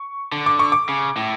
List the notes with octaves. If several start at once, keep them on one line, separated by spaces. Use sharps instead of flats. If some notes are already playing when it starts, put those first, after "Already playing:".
Already playing: C#6
D3
D6
C#6
D6
C#3
A2